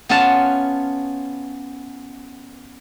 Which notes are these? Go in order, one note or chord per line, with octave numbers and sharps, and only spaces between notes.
B3 C#4 F4 F#5 A5